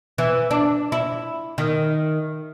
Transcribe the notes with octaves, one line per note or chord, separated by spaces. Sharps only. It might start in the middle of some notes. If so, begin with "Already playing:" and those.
E3
D4
E4
D#3